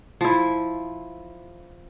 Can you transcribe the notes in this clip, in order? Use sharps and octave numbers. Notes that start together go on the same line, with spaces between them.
F3 E4